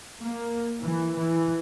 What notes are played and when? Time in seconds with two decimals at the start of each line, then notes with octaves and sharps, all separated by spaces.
0.21 A#3
0.81 E3
1.16 E3